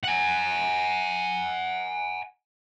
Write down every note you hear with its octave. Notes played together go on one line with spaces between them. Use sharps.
F#5 G#5